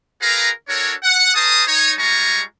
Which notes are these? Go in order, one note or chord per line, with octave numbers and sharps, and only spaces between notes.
F4 G#4 A#4 B4 F5 A#5
D4 F#4 A4 A#4 C#5
F#5
G#4 A#4 C5 A5 D#6
D#4 C#5
G3 G#3 F4 G#5 A#5 C#6